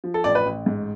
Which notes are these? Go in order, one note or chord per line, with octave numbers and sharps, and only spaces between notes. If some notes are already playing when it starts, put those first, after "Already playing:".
F3
A4
A1 D5
B4
A1
G#2